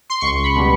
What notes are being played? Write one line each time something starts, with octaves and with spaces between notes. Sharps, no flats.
C6
C#2 C#6
B5
B2 G3